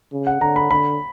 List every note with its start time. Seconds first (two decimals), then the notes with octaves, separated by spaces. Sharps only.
0.12 C#3
0.27 F#5
0.41 D3 A#5
0.56 B5
0.71 D3 B5